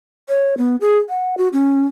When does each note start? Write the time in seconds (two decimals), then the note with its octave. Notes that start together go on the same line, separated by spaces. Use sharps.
0.29 C#5
0.58 B3
0.81 G#4
1.09 F#5
1.38 F#4
1.53 C#4